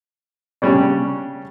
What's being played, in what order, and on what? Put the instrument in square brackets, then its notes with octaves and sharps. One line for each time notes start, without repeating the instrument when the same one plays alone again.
[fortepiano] C#3 G3 C#4 D4